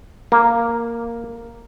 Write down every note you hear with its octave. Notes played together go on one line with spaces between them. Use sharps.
A#3